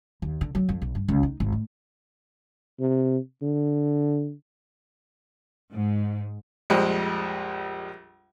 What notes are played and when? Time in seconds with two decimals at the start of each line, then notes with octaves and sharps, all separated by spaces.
0.22 D#2
0.41 D3
0.55 F#3
0.69 F2
0.82 B1
0.95 G2
1.09 C#2
1.23 D#4
1.40 G#1
1.52 A2
2.80 C3
3.42 D3
5.73 G#2
6.70 A#1 F2 F3 G3 G#3